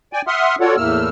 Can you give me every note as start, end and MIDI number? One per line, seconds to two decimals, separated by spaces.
0.13 0.22 74
0.13 0.22 79
0.13 0.22 80
0.27 0.56 76
0.27 0.56 78
0.27 0.56 84
0.27 0.56 87
0.27 0.56 89
0.60 0.76 65
0.60 0.76 66
0.60 0.76 69
0.60 0.76 73
0.60 0.76 74
0.60 0.76 78
0.77 1.09 40
0.77 1.09 45
0.77 1.09 57
0.77 1.09 58
0.77 1.09 88
0.77 1.09 89